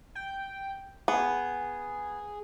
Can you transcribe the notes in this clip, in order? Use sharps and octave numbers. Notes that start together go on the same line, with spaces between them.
G5
B3 G#4